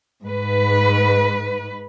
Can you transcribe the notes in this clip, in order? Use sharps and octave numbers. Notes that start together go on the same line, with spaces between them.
G#2 B4